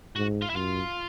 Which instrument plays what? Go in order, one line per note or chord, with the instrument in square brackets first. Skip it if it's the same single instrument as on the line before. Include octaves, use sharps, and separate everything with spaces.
[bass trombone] G#2 [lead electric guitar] F#4
[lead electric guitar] F4
E4
[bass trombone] F#2 [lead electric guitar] F4